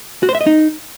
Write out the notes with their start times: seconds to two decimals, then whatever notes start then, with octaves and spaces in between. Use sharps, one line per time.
0.23 F#4
0.29 C5
0.35 E5
0.41 D#5
0.47 D#4